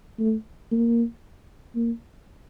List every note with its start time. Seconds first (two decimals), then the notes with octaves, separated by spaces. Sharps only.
0.19 A3
0.72 A#3
1.76 A#3